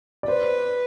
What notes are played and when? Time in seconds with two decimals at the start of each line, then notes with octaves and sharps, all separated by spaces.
0.23 D5
0.28 B4 C5